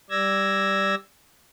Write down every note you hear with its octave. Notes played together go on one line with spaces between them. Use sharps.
G3 D5 E6 G#6 A#6